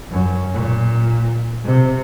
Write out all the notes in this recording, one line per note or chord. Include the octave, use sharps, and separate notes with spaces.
F#2
A#2
C3